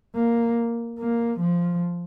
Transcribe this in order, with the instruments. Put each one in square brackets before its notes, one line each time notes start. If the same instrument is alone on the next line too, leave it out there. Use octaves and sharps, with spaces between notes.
[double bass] A#3
A#3
F3